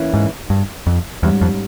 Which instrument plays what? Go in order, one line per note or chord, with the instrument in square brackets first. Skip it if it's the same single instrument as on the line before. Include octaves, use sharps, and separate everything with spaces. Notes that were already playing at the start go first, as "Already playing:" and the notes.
Already playing: [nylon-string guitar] E3 A#3 C#4 E4
[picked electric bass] G#2
G2
F2
[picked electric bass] E2 [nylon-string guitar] G#2 G3 C#4
[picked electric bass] F2